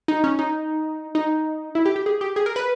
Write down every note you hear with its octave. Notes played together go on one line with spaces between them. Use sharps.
D#4
C#4
D#4
D#4
E4
G4
G4
G#4
G4
G#4
A#4
B4